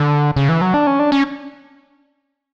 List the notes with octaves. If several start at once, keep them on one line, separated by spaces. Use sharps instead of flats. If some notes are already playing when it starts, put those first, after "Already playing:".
Already playing: D3
C#3
E3
F#3
D4
C#4
D4
C#4